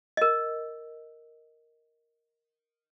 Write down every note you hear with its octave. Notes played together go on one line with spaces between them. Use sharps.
A#4 D#5